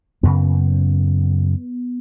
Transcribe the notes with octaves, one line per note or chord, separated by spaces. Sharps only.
F#2 C#3 B3